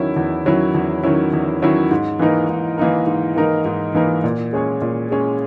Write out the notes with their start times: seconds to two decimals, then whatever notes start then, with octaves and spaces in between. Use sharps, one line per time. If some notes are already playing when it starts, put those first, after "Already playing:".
Already playing: E2 D#3 F#3 C#4 E4
0.16 E2
0.45 D#3 F#3 C#4 E4
0.74 E2
1.03 D#3 F#3 C#4 E4
1.33 E2
1.62 D#3 F#3 C#4 E4
1.91 G#2
2.19 E3 A#3 D#4 A#4
2.49 G#2
2.78 E3 A#3 D#4 A#4
3.07 G#2
3.36 E3 A#3 D#4 A#4
3.66 G#2
3.95 E3 A#3 D#4 A#4
4.24 A#2
4.53 G#3 C#4 G#4 C#5
4.82 A#2
5.10 G#3 C#4 G#4 C#5